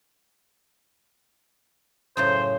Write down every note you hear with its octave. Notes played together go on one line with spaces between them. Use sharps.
F#2 A2 C#3 C5